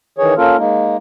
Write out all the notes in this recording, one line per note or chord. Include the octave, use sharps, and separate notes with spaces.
D#3 E3 G#4 C#5
A#3 C#4 F4 A4 A#4
G#3 A#3 D#4